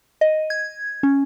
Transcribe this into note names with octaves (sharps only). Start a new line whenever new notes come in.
D#5
G#6
C#4